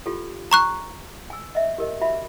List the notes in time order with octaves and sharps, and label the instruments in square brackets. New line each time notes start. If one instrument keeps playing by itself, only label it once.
[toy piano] F4 G4 A4
[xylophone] A#5 C#6 F#6
[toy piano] G#5 E6
D#5 E5
G4 A#4 D#5
F#4 E5 B5